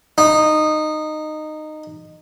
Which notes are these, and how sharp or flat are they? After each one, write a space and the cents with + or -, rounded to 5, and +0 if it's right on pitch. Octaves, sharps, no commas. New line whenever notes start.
D#4 -15